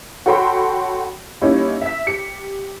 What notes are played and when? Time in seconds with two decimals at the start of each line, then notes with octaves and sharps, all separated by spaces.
0.26 F#4 A4 C#5 G5 B5 C6
1.41 G3 A#3 C#4 D#4 E4
1.81 E5 B6
2.07 G4 C#7